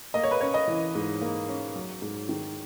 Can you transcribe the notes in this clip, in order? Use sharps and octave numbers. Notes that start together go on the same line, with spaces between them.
A#3 D#5
C#5
B4
C#4 C#5
D#5
E3
G#2
A#3
C#4
F#3
G#2
D#3